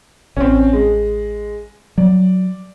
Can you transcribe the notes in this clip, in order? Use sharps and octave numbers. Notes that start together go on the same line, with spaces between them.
A1 C4 C#4
G#3
F#3 D5